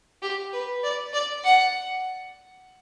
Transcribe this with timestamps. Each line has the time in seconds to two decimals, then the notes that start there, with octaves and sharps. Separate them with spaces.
0.22 G4
0.53 B4
0.83 D5
1.13 D5
1.44 F#5